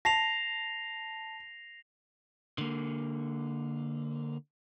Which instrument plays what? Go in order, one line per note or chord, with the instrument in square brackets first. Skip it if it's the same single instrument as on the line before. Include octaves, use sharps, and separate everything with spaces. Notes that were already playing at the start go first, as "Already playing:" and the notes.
[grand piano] A5 [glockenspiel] A#6 C7 F7
[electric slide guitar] D3 A#3